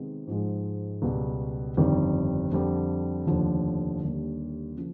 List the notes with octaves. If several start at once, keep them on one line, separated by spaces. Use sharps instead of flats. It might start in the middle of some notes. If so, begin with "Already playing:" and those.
Already playing: C3 D#3 G#3 B3
G#2 F3 G#3
C#2 B2 G3
G1 F2 C3 D#3 G3
F2 D3 G3
F1 D#2 D3 F3
D#2 D3 G3 A#3
C#3 F3